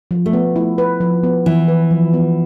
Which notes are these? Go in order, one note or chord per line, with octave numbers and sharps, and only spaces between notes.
F3
A3
B3
E4
B4
F3
B3
E3 E4
B4
F3
B3